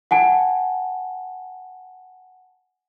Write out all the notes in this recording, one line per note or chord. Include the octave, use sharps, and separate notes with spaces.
F#5 G#5 A5